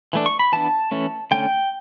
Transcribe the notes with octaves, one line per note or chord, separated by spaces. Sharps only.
E3 A3 D4
C#6
B5
E3 B3 D4 A5
E3 A3 C#4
D3 A3 C#4 G5